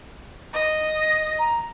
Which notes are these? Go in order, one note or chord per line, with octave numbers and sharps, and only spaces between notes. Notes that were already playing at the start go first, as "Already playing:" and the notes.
D#5
A#6
A#5